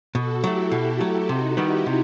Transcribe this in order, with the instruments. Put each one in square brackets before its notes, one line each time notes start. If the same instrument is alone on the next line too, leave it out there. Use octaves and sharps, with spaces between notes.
[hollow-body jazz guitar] B2 [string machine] F#4 A4
[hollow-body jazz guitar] F#3 A3 [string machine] E4 G4
[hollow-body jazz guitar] B2 [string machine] E4 G4
[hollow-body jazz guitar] F#3 A3
[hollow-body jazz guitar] C3 [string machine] D#4 F#4
[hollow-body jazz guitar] D#3 G3 B3 [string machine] E4 G4
[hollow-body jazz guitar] C3